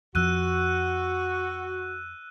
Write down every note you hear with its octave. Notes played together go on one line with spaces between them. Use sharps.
F2 F3 F#4 E6 F#6 D#7